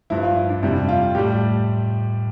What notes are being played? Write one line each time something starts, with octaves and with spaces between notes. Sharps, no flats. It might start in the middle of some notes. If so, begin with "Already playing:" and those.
G2 F3 E4
F4
E4
D4
F2 C3 G3 E4
F4
A2 G3 G4